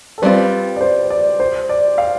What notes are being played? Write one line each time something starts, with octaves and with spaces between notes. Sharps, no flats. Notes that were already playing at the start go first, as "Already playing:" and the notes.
A4
G3 C4 F4 B4
D5
C5
D5
C5
D5
F5